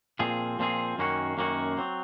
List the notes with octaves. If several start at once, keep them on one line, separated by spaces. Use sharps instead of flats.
A#2 F3 C4 F4 G#4
A#2 F3 C4 F4 G#4
F#2 D#3 A#3 C#4 F#4
F#2 D#3 A#3 C#4 F#4
F#3 C4